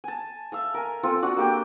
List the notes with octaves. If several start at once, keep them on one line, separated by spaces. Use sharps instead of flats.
G#5 A5
E5 F5 A5
A#4 G#5
C4 F4 A4
D4 F#4
A#3 G4 G5